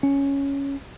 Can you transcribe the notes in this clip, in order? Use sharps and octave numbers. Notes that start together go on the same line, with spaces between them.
C#4